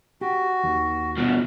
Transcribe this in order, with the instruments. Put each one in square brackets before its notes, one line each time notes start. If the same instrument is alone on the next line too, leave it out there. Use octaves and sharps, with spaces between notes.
[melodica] F#4 [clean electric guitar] G4
[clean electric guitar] D#2
[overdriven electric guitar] G2 B2